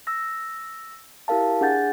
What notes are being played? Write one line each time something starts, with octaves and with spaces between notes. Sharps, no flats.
E6 A#6
E4 G4 A#4 F5 A5
D4 G#4 F#5 G6 A6